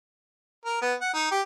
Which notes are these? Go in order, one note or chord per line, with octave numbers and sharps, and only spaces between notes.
A#4
B3
F#5
D#4
G4